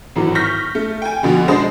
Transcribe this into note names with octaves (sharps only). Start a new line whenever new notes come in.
G#1 A2 E3 F#3
C#6 F6 G6 A#6 B6
A3
G5 G#5
F2 B2 D3
G#3 D4 C5 D#6